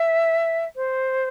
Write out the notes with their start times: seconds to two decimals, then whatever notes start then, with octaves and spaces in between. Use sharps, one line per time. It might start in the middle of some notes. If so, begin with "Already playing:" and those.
Already playing: E5
0.76 C5